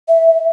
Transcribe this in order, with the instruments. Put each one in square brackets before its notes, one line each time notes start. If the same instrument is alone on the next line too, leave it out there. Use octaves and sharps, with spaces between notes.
[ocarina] E5